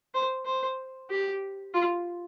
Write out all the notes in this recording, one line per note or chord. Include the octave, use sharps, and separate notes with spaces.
C5
C5
G4
F4